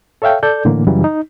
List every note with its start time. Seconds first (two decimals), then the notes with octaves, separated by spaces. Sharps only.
0.22 A4 C#5 E5 F5 G5
0.43 A4 D5 G6
0.65 A2 D3 E3 A#3
0.87 F#2 C#3 E3 F#3 G3
1.04 D#4